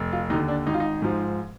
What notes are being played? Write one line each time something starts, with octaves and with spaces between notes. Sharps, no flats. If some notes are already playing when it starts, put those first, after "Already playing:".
Already playing: F1
F4
D#2 D3 D#4
D4
G#1 D#4
F4
D#4
G#2 F3